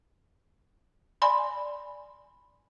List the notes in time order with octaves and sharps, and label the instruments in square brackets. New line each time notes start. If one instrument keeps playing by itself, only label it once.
[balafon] D5 G#5 B5 C6